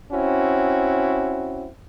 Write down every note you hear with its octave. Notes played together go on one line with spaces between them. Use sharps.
C4 C#4 E4 F#4